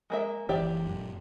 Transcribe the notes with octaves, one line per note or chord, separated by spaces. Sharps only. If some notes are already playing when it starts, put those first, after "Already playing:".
G#3 A#3 E5
F#1 E3 G4 D5 E5
F#2 A#2